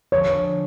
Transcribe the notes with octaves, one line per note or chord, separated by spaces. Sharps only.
D3 F3 G#3 C#5